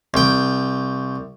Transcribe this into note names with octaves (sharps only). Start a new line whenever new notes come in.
C2 G5